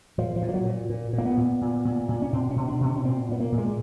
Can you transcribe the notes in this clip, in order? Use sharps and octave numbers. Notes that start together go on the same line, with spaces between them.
A#2 F3
F3
A#2
F3
F#3
A#2
A#2
A#2
A#3
B3
A#2
A#2
A#2
A#2
C#4
B2 C4
C#4
B2
D4
B2
C#4
C#4
A#2 C4
A#2 B3
A#3
A#2
G#3